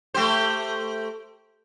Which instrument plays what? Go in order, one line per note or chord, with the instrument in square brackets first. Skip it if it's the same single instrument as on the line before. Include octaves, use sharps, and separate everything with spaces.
[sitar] A3 G4 C5